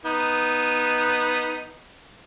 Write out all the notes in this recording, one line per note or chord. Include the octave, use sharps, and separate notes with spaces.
B3 D#4